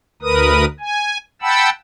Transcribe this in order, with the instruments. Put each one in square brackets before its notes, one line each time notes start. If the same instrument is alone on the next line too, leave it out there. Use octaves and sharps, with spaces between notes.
[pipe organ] D2 A#4 B4 D#6
G#5
F#5 G5 A5 B5 E6